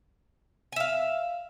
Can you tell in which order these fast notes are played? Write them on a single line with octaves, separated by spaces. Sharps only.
G#5 E5 F5